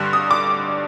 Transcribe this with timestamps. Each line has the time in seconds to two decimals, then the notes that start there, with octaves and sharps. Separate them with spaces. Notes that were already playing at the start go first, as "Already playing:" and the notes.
Already playing: G2 D3 G3 F#6
0.13 D#6
0.31 D6